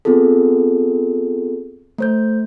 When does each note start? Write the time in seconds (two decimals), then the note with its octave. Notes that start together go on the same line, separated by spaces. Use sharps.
0.05 B3 C4 F4 G#4 A4
1.98 A3 C5 G6